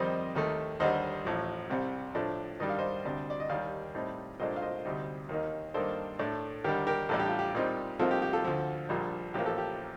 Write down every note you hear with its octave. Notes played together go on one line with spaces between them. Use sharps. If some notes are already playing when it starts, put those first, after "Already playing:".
Already playing: F2 D#3 G3 C4 D#4 C5 D#5
D#2 D#3 A3
D#2 D3 G3 C5 D#5
A1 A2 F3
C2 C3 G3
A2 F3 A3 D4
G2 D#3 G3 D4 D#5
F5
C5 D#5
D2 C3 G3 D4
D5
D#5
D#2 D#3 G3 D5 F5
A2 G3 C4 D#4
C2 A#2 A3 D4 C5 D#5
F5
C5 D#5
D2 C3 G3 C4 D#4
D#2 D#3 A#3 D#4
G2 D#3 A#3 D4 A4 C5
A2 A3 D4
D#2 D3 G3 G4 A#4
G4 A#4
A1 A2 G3 D4 A4
G4
F4
G4
A#2 G3 C4 D#4
C2 C3 F3 A#3 D#4 F4 A4
G4
G4
F4 A4
D2 D3 F3
A#1 A#2 G3
A1 A2 F3 A#3 G4
A4
G4